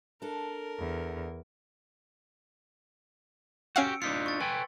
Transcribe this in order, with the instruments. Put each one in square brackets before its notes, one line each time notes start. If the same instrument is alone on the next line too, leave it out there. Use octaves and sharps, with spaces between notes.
[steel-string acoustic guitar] D4 A4 [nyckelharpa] A#4
[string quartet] E2
[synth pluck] C#4 F5 F#5 [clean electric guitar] F#4 G4 [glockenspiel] E6 C#7 D7
[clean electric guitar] D4 D#4 F4 [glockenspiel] B6 C#7
[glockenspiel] C#6 A6
[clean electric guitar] B4 G5 G#5 [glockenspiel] C6